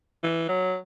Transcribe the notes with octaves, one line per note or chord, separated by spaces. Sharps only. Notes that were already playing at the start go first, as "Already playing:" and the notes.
E3
F#3